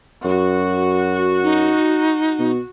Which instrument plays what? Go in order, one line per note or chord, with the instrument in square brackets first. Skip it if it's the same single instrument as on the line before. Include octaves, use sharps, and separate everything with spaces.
[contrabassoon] F#2 [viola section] F#4
[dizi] D#4
[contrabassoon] B2